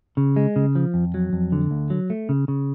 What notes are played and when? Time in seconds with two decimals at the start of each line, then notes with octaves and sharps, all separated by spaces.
0.17 C#3
0.36 G#3
0.56 C#3
0.75 F3
0.94 F2
1.14 F#3
1.33 F2
1.52 D3
1.71 D2
1.90 F#3
2.10 A3
2.29 C#3
2.48 C#3